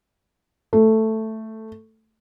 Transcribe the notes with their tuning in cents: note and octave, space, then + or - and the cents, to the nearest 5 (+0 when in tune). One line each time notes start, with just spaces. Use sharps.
A3 +5